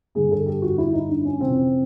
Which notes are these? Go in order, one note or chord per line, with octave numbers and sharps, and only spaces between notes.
G2 D3 G#4
A4
G4
F#4
E4
D#4
D4
C#4
F2 C3 E3 C4